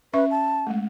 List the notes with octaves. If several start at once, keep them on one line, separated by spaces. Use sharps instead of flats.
C#4 B4 E5 C#6
A5
G#3 A3